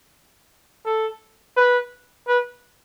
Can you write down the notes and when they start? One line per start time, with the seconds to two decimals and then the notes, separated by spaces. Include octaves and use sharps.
0.86 A4
1.57 B4
2.28 B4